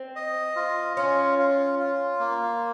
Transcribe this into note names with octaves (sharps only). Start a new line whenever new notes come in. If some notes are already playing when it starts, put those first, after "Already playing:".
Already playing: C4
D#5
F4
C#4 F4
F4
F4
A#3